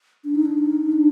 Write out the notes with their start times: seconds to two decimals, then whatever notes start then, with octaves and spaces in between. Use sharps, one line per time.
0.24 D4
0.35 D#4
0.45 D4
0.58 D#4
0.92 D4